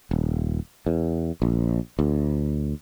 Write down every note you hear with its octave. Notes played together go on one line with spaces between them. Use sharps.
D#1
E2
A#1
D2